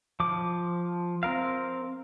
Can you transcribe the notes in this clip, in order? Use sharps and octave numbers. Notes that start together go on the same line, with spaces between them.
F3 D6
C4 A#4 F5